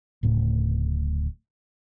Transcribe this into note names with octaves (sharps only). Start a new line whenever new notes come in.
D1 A2 C#3